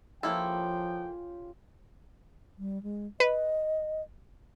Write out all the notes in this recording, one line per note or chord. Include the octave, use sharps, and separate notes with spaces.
C#3 F3 A#3 E4 F4 G4 A4 G5
G3
G#3
B4 D#5